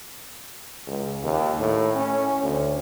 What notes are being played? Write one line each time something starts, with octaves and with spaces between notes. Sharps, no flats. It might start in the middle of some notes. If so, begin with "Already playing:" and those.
C#2
D#2
A2
C#4
D2